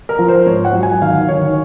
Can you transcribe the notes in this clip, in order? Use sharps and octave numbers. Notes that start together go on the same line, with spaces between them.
A#4
F3
C5
G#2 C#5
F#5
F#3
G#5
D#3 F5
D#3 C#5